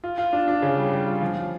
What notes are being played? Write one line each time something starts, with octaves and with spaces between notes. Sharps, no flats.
F4
F4
D4
D4
C#3
G3
G3
F4
F3
F3